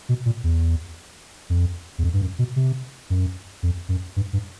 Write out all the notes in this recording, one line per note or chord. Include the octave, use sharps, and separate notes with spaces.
B2
A#2
E2
F2
E2
F2
G2
F#2
B2
C3
F#2
F2
F#2
G2
G2